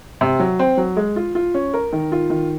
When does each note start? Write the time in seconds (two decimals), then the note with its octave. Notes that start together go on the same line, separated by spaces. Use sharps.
0.21 C3
0.40 F#3
0.59 C4
0.77 F#3
0.97 G#3
1.16 F4
1.35 F4
1.54 C#4
1.74 A#4
1.92 D#3
2.12 F4
2.30 D#3